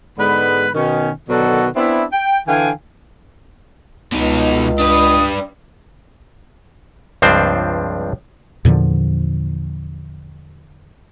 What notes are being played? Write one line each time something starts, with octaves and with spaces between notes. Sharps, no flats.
G#2 D3 G#3 B3 B4 B5
B2 D#3 C#4
B2 D3 D#3 F#3 F#4 A4
B3 C4 D4 E4
G5
D3 E3 F5 G5 G#5
C#2 B2 D#4
D4 B4 D#6
C#2 G2 F3 C4 D4 C5
E2 A#2 D3 F3